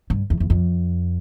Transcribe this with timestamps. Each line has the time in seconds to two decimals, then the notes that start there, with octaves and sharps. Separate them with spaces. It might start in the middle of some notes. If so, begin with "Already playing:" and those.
0.10 G2
0.30 E2
0.40 E2
0.50 F2